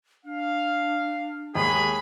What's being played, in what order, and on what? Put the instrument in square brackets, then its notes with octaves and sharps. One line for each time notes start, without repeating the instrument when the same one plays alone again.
[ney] D4 [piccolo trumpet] F5
[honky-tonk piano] D#2 G#3 [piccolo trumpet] G#4 [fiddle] B5